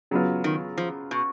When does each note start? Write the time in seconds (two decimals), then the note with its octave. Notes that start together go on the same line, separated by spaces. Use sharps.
0.11 C#3 F#3 B3 F4
0.44 D#3
0.78 F3
1.11 B2